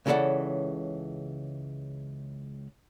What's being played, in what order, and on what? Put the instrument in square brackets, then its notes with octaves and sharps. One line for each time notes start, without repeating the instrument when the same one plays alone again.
[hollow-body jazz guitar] C#2 C#3 E3 A4 D5 F#5